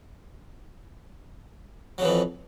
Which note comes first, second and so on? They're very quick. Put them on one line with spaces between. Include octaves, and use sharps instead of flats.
F#3 C#3 E3 F2